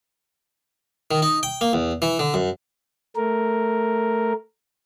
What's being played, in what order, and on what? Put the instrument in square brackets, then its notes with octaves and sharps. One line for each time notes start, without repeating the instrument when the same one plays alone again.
[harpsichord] D#3
D#4
G5
A#3
E2
E3
D3
F#2
[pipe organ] A3 A#4